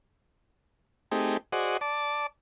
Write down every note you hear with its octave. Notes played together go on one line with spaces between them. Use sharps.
A3 C4 D#4 G4 G#4
F#4 G#4 C5 D5 D#5 F#5
D5 A5 D6